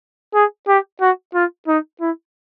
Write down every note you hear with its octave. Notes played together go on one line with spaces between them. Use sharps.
G#4
G4
F#4
F4
D#4
E4